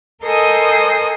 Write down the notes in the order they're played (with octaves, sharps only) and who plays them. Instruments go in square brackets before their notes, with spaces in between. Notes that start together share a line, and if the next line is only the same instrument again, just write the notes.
[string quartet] A4 A#4 C5 D#5 G#5 D#6